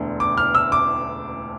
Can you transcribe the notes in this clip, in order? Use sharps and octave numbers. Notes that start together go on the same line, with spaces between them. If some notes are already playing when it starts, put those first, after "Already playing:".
Already playing: E1 D2 D3
D6
F6
E6
D6